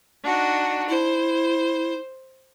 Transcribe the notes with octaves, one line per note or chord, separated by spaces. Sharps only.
D4 D#4 F#4
E4 C5